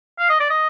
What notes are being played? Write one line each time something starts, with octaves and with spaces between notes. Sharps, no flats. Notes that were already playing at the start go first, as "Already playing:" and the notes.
F5
D#5
D5
D#5